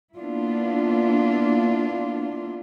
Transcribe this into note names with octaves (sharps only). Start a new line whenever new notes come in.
A#3 B3 D4 E4 F4